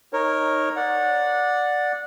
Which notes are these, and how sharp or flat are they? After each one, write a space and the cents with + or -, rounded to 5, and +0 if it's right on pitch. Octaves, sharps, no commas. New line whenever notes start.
D#4 +0 A#4 +0 C#5 -15
D5 +0 F#5 -20